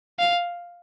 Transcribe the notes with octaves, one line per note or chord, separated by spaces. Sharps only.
F5